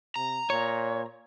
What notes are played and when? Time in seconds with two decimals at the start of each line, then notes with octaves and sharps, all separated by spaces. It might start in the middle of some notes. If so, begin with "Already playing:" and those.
0.16 C3 A#5
0.50 A#2 C#5